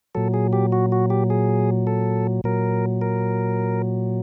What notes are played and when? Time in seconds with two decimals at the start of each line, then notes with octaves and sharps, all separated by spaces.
0.15 A#2 F#3 A4
0.34 G#4
0.53 G4
0.72 F#4
0.92 F#4
1.10 G4
1.30 G#4
1.87 A4
2.44 A#2 F#3 A#4
3.01 A#4